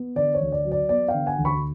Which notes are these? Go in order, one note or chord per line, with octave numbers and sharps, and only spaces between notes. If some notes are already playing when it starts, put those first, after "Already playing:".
Already playing: B3
D3 D5
C#5
D2
D5
F#3
D5
B3 D5
F5 G5
D3
F#5 G#5
D2
B5 C#6